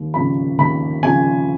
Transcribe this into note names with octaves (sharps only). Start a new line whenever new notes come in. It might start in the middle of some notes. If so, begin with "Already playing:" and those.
Already playing: D#2
C#3 F3 B5
D#2 B5
C#3 F3 G#5